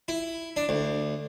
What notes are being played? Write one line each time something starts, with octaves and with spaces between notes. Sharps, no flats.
E4
D4
D2